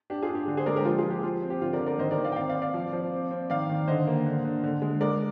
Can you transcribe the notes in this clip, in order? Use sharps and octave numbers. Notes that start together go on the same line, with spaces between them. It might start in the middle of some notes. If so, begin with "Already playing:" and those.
D4 G4
F4 G#4
D4
G4
D3
G#4 C5
G#3 A#4 D5
G4 A#4
F3 F4 G#4
F4 G#4
F3
G4
F3 F4
C4
G4
D3 F4
A#4 D5
D3
A#4 D5
D#3 C5 D#5
A#4 D5
D#3
D5 F5
G5
C4 D5 F5
D5 F5
C4
D5 F5
F3
F3
C4
C4
D#3 D5 F5
D#3
D3 C5 D#5
A#3
D3
D3
D3
G#3
G#3 A#4 D5